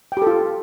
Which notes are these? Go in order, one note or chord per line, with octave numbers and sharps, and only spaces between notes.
F4 G4 A4 G5